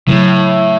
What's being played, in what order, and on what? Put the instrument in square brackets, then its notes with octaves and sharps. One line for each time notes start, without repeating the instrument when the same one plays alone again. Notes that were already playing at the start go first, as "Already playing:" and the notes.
[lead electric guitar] A2 [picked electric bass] C#3 F#3